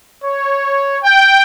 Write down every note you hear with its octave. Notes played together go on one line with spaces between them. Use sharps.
C#5
G5